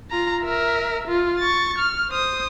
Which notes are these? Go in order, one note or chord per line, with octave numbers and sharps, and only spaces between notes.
F4 A#5
A#4 E5
F4
C#6 A6
F6
C5 D#6